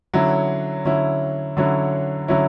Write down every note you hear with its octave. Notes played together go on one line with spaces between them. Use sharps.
D3 F#3 C#4 E4
D3 F#3 C#4 E4
D3 F#3 C#4 E4
D3 F#3 C#4 E4